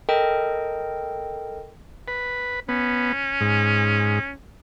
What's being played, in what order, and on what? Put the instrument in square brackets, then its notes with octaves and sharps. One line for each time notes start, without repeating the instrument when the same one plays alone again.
[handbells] A4 A#4 D#5 G5
[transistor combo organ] B4
[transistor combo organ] B3 [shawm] C#4
[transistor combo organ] G#2